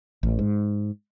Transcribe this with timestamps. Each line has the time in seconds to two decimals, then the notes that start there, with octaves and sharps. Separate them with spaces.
0.23 A1
0.39 G#2